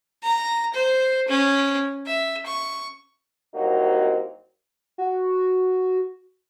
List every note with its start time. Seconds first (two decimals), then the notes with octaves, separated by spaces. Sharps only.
0.23 A#5
0.74 C5
1.28 C#4
2.06 E5
2.46 C#6
3.55 C2 F#3 A#3 C4 D#4 F#4
4.98 F#4